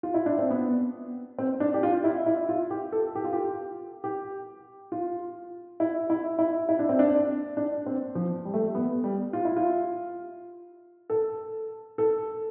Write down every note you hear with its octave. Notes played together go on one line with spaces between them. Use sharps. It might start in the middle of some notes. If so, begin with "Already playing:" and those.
F4
E4
D4
C4
B3
C4
D4
G4
F4
E4
E4
F4
G4
A4
G4
F4
G4
G4
F4
E4
E4
E4
E4
D4
C4
D4
D4
C4
F3
G3
A3
G3
B3
G3
F4
E4
F4
A4
A4